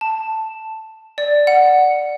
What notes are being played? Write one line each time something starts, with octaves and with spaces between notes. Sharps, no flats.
A5
D5
F#5